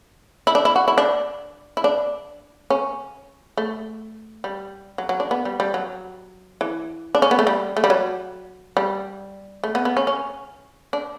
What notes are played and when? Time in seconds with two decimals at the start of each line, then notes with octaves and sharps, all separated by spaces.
0.47 E4
0.55 D4
0.65 E4
0.76 F#4
0.88 E4
0.98 D4
1.77 E4
1.84 D4
2.70 C#4
3.57 A3
4.44 G3
4.98 F#3
5.09 F#3
5.20 D4
5.31 B3
5.45 G3
5.60 G3
5.74 F#3
6.61 E3
7.15 D4
7.22 C#4
7.31 B3
7.39 A3
7.47 G3
7.77 A3
7.84 G3
7.90 F#3
8.77 G3
9.64 A3
9.75 B3
9.85 B3
9.97 C#4
10.07 C#4
10.93 D4